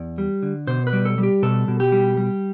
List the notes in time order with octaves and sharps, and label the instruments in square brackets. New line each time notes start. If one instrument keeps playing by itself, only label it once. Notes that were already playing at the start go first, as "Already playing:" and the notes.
Already playing: [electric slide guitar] E2 D5
G3
D3
B2 C5
B4
G3
A4
G3
G4
B2 A4
B2
G4
G3
G3